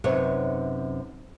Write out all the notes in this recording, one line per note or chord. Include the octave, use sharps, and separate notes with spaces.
F#2 C3 D#4 B4 C#5